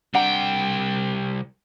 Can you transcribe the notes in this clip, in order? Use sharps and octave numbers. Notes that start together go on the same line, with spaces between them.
C2 D4 F#5 G5 A#5